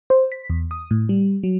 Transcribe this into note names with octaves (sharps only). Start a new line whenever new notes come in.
C5
B6
E2
D#6
A2
G3
F#3